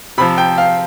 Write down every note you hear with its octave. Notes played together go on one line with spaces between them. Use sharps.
C3 F3 B5
G5
F5